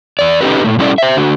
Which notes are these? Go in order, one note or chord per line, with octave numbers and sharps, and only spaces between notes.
E2 D5
C#4 D#4 F4 G4 A4 B4
A#2 A3
G3 C#4 E4 A4 D5
C5 E5
D3 F#4